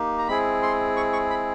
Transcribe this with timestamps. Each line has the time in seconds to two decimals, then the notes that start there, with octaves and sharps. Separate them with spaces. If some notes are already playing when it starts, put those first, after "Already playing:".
Already playing: A#3 D#4 G4
0.18 A#5
0.28 G#3 C4 E4 G#4 B5
0.63 C6
0.97 C#6
1.13 C#6
1.30 B5